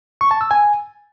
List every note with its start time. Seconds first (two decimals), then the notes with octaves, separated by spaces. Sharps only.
0.21 C#6
0.31 A5
0.41 E6
0.51 G#5